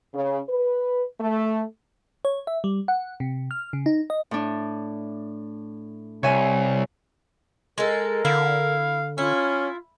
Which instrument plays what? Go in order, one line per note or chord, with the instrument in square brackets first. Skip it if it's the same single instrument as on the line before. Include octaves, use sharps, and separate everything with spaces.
[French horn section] C#3
B4
A3
[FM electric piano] C#5
E5
G3
F#5
C3
F6
C#3
D#4
D#5
[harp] A2 D4
[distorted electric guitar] C2 [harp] C#5 E5 G#5
[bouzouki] G#3 A4 [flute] A#4
[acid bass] D3 [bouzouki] E4 [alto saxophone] F5
[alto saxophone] C#4 [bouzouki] E4 [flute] F4